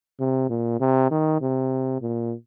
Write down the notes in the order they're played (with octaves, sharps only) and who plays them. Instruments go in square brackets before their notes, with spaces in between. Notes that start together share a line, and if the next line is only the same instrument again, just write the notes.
[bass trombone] C3
A#2
C3
D#3
C3
A#2